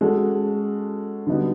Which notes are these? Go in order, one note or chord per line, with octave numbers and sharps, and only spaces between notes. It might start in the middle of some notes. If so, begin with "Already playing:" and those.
G#3 C#4 F#4 A4
D3 G3 B3 D#4 F#4